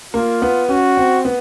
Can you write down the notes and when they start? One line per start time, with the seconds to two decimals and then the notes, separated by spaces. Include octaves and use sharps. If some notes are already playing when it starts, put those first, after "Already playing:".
0.14 A#3 F4
0.42 B3
0.69 C#4 F#4
0.97 C4
1.25 B3